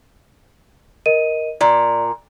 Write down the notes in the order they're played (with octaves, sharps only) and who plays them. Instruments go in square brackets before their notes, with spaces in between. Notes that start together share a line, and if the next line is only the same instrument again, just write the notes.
[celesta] A#4 D#5 D#7
[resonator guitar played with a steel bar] A#2 [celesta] D5